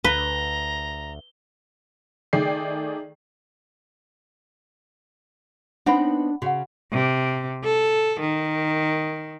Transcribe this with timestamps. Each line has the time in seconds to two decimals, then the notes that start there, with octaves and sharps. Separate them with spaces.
0.04 D2 B4 A#5 G7
2.33 D#3 A3 G#4 D5 G5 C7
5.86 B3 C4 D4 D#4 F#5 B5
6.42 C#3 F#4 F#5
6.92 C3
7.64 A4
8.20 D#3